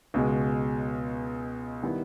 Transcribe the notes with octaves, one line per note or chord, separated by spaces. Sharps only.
C#2 B2 G#3
D#3 G3 B3 E4